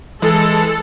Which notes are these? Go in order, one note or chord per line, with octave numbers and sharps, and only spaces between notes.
E3 G#3 A4